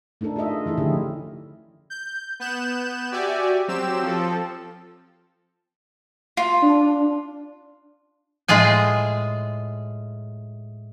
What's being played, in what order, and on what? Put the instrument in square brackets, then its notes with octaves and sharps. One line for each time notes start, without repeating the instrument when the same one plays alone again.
[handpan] A3 D4 D#4 A4 A#4
F4 G#4 D#5 E5
E3 A3 E4 G#4
D3 D#3 F3 C#4 E4 G4
[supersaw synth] G6
B3 F#6 G6 E7
F#4 G4 D5 E5 G#5
F#3 C4 G4 E6 E7
F3 C4 A4
[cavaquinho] F4
[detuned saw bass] D4
[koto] A2 G#3 F4 G#4 G#5